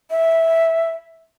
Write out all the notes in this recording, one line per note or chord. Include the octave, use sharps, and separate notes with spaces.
E5